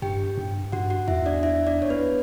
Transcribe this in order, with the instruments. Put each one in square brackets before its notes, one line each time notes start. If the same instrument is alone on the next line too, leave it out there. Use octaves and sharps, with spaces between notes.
[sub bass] G2 [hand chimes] G4 G5
[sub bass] G2
[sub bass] G2 [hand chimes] F#4 F#5
[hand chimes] F#4 F#5
[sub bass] E2 [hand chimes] E4 E5
[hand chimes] D4 D5
E4 E5
D4 D5
C#5
B3 B4